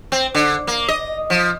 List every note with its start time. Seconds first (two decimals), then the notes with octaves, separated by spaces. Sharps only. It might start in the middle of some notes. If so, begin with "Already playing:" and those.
0.12 C4
0.35 D3
0.67 A#3
0.88 D#5
1.30 F3